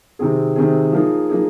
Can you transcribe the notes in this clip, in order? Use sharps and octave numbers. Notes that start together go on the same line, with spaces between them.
C3 D#3 C4 G#4
C3 D#3 C4 G#4
F3 A#3 D#4 G#4
F3 A#3 D#4 G#4